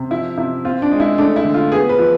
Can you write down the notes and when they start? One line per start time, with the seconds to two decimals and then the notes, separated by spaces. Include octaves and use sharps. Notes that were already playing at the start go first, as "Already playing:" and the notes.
Already playing: C3
0.11 F3 E4
0.37 C3 E4
0.65 C4 F4
0.82 D4
0.91 G#3
1.00 E4
1.18 A3 D4
1.36 E4
1.44 D3
1.54 F4
1.72 B3 G#4
1.89 B4
1.99 F3